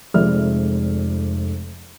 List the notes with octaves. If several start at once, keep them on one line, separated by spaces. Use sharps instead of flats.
F1 F2 G#3 D5 E5 F6